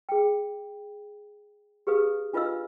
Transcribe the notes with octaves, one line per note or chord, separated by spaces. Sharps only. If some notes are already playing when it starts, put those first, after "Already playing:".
G#4 G5
G4 G#4 B4 F5 D#6
D4 F4 B4 D#5 F5 E6